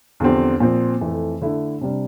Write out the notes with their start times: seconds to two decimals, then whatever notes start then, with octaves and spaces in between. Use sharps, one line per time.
0.20 E2 D3 F3 C4 G4
0.60 A#2 F3 C4
1.01 F2 E3 A3
1.41 D3 A3 E4
1.81 C3 G3 D4